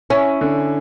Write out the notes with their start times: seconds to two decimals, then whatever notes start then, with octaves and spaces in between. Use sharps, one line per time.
0.10 C#4 E4
0.41 D3